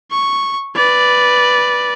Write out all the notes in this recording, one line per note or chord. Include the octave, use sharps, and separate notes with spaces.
C#6
B4 D5